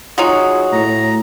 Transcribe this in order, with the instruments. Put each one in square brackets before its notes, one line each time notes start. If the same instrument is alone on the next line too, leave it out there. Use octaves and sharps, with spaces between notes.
[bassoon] F#3 [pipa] D#4 F4 F#4 [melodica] G#4
[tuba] A2 [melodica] A#5